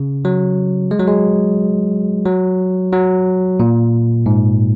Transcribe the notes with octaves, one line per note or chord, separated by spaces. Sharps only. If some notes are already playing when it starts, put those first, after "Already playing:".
Already playing: C#3
F#3
G#3
F#3
G#3
F#3
F#3
A#2
G#2